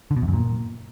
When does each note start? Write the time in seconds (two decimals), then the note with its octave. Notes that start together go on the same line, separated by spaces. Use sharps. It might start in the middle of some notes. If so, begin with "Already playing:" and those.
0.11 D3
0.16 B2
0.22 E2
0.28 F#2
0.34 A#2